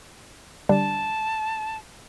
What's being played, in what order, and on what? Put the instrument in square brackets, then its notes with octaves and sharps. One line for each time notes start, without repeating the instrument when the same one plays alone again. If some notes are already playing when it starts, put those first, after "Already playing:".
[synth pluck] D3 G3 D4 [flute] A5